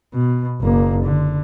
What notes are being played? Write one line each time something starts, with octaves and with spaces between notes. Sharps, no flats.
B2
F#1 A#3
D3